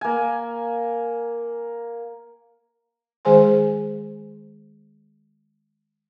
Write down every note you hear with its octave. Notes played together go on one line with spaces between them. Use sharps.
A#3 G#5
D#3 G#3 G#4 C5 G#5 C6